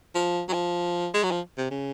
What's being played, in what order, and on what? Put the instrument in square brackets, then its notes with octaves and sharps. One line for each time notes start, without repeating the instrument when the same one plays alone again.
[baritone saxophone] F3
F#3
F3
G#3
F#3
F3
C3
C#3